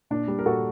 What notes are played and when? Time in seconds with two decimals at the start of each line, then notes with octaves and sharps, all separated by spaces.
0.10 A#2 D4
0.28 G3
0.39 A#4
0.46 A#2 F#4 A4